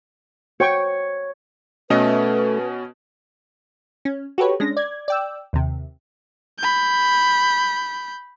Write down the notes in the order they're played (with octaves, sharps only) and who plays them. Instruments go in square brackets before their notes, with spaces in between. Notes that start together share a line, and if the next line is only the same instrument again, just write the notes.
[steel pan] F#4 G5 C#6 [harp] C#5
[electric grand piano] B2 C#4 D#5 [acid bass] A3 [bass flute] B4
[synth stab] C#4
F#4 G4 A4 B4 C#5
G#3 C#4 D4 A#6
D5 G#6
D5 G5 E6
D#2 C3
[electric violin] B5 G6